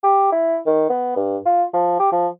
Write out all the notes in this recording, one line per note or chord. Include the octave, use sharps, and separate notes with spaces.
G4
E4
D#3
B3
G2
F4
F3
G4
F3